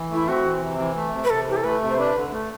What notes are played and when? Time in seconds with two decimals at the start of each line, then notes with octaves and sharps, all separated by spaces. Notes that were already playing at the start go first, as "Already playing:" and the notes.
Already playing: E3
0.11 A3 E4
0.28 C4 F#4
0.45 E3
0.62 C3
0.79 E3
0.96 A3
1.13 C3
1.24 B4
1.30 C3 A4
1.47 E3 G4
1.57 A4
1.64 A3 B4
1.81 C3
1.89 C5
1.98 D4 B4
2.16 D3
2.33 A3